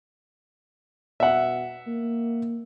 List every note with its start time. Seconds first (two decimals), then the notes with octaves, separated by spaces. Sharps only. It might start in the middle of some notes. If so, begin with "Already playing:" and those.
1.20 B2 E5 F#5
1.87 A#3